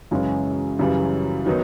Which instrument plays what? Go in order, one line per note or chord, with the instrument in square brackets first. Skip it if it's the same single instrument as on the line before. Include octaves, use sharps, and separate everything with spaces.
[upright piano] F#2 C#3 E3 G#3 C#4
F#2 C#3 E3 G3
D#3 F#3 B3 D#4